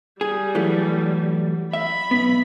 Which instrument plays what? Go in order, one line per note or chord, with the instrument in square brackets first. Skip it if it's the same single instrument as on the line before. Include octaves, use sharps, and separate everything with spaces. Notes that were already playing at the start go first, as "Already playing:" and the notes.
[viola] G3 [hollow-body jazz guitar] G#4
[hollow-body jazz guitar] E3 F#3 A3
[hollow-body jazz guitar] E5 [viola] B5
[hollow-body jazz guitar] B1 B3